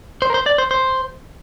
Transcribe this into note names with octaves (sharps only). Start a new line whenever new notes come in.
C5
A#4
C5
D5
C5
C5